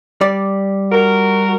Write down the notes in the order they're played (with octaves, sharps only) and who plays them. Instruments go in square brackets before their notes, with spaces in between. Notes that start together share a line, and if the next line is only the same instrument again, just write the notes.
[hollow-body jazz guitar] G3 D5
[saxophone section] F#4 A#4